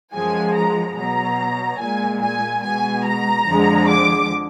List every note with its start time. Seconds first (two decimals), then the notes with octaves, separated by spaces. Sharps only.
0.13 F#2 F3 G#3 G#5
0.55 A#5
0.96 B2 F#3 A#5
1.80 A#2 G#3 G#5
2.21 G#5
2.63 B2 G#3 G#5
3.05 A#5
3.46 F2 D3 F3 G#3
3.88 D6